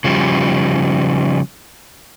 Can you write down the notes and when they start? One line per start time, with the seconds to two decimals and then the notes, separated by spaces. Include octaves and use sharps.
0.04 C#3 F3 G3